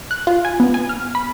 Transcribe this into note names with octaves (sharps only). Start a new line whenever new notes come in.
F#6
F4
G#5
B3
G#5
F6
B5